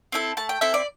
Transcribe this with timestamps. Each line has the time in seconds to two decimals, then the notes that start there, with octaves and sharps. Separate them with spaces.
0.12 C4 E4 A4
0.37 A3 A5
0.49 G5
0.61 C4 E4 A4 E5
0.74 D5